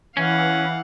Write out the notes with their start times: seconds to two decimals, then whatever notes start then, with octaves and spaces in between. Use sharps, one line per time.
0.17 E3 C#4 F5 F#5